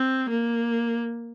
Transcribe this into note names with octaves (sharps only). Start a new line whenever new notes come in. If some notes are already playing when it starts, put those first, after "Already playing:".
Already playing: C4
A#3